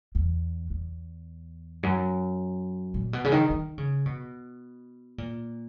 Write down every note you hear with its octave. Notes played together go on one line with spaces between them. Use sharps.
E2
E2
F#2
A#2
B2
C#3
D#3
D#3
C#3
B2
A#2